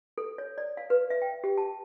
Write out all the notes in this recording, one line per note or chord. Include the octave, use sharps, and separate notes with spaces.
A4
C#5
D5
F5
B4
E5
G5
G4
A5